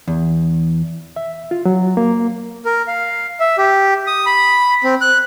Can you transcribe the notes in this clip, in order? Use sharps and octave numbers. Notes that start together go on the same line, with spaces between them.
E2
E5
F4
F#3
A#3
A#4
F5
E5
G4
D#6
B5
C4
F#6